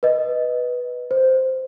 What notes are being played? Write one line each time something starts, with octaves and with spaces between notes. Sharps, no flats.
B4 D#5
C5